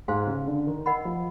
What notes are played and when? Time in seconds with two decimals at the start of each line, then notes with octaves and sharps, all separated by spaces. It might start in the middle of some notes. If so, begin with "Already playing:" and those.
0.08 G#2 C5 F5 G#5 C6
0.27 C#3
0.47 D3
0.67 D#3
0.86 A#4 D#5 F#5 B5
1.05 F3